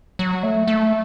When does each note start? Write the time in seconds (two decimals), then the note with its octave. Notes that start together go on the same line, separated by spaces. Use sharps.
0.19 F#3
0.43 A3
0.67 A3